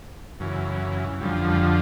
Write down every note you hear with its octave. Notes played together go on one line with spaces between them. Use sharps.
F#2 C#3 E3
F2 D3 F3 G3
G3